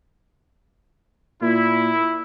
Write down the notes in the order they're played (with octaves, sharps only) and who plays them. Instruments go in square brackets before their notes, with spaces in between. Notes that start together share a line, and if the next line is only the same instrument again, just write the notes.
[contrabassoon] A#2 [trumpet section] E4